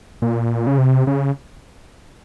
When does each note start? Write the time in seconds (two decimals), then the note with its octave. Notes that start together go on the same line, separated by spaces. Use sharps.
0.22 A#2
0.67 C#3
0.78 C3
1.07 C#3